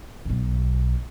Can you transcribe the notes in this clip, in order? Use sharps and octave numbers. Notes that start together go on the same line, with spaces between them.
B1 B2